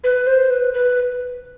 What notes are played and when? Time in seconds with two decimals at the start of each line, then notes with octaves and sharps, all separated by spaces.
0.04 B4
0.27 C5
0.50 B4
0.74 B4